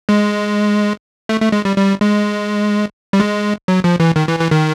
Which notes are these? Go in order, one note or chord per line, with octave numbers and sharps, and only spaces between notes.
G#3
A3
A3
G#3
G3
G3
G#3
G3
G#3
F#3
F3
E3
D#3
E3
E3
D#3